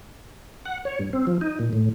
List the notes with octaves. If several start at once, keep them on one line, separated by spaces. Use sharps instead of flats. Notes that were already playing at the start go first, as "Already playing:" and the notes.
F#5
C#5
G2
C4
F3
D#4
A#2
A2